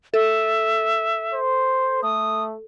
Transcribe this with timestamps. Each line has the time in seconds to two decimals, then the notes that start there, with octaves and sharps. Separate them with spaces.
0.14 A4 E5
1.34 C5
2.03 A3 D#6